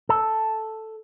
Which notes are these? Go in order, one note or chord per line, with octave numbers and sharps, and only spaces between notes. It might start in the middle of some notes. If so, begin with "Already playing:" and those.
A4